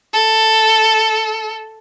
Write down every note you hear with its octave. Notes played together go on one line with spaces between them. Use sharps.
A4